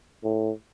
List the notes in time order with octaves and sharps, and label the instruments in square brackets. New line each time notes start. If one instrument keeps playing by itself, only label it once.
[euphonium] A2